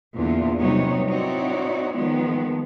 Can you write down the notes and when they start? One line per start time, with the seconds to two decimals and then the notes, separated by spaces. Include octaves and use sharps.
0.15 E2 A#2 D3 E3 D4 F4
0.60 C3 F#3 G3 B3 D#4 C#5
1.08 C4 D#4 E4 F#4 C#5 D5
1.96 D#3 F3 G#3 B3